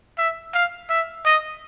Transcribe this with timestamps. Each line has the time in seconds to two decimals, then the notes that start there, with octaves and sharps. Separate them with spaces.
0.18 E5
0.54 F5
0.90 E5
1.25 D#5